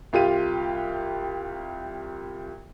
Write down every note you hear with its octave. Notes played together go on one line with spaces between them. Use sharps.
C2 F4 G4 F5 D#7